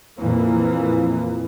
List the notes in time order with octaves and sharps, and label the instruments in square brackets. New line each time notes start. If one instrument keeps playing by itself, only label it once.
[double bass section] F2 A#2 E3 F3 A#3